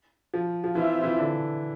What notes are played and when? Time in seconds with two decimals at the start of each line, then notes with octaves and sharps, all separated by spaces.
0.34 F3
0.64 F3
0.75 E3 C4 F4 C5 E5
1.04 E3
1.18 D3